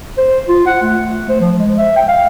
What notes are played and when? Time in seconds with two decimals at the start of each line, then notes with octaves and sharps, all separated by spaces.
0.18 C5
0.48 F4
0.67 F#5
0.83 A3
1.29 C5
1.41 F3
1.59 G#3
1.78 E5
1.96 G5
2.08 F5